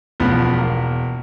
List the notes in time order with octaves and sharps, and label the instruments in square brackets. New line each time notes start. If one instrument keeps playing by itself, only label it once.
[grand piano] E1 [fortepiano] F3 B3
[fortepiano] A#3